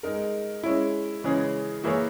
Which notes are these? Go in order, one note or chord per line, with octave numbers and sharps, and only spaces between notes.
G#3 D#4 A#4
G#3 C#4 E4
C#3 E3 G#3 C#4 G#4
E3 A#3 E4 G#4 C#5